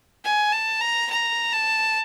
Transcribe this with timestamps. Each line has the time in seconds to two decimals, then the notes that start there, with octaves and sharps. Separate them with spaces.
0.24 G#5
0.53 A5
0.81 A#5
1.10 A#5
1.53 A5